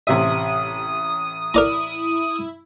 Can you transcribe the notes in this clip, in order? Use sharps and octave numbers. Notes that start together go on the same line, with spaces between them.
A1 C3 E5 D#6
E4 A#4 D5 A#5